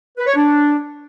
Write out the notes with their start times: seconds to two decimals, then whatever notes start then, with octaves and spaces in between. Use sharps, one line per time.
0.18 B4
0.27 C#5
0.35 D4